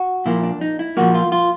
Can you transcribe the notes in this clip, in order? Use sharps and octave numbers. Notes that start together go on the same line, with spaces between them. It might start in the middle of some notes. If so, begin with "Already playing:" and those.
Already playing: F#4
A#2 F3 A#3 E4
D4
D#4
E4
A#2 F3 A#3 F#4
F4
F4